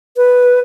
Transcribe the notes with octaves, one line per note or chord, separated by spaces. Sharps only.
B4